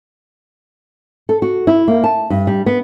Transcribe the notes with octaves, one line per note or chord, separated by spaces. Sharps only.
A4
F#4
E4
A#3
A5
G2
G3
B3